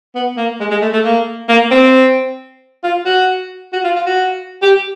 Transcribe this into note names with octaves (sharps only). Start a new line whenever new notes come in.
B3
A#3
G#3
G#3
A3
A3
A#3
A#3
C4
F4
F#4
F#4
F4
F4
F#4
G4